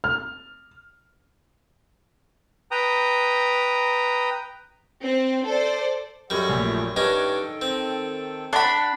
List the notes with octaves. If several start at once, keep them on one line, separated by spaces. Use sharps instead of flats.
F6
B4 G5 A#5 D#6
C4 C5
A4 C5 D5
F#2 G3 A4 D#5 F#5
A#1 A#2 A3 E5
G2 D#3 C#4 D4 A4 D#5 G5
C4
D4 F#5 A5 B5 F#6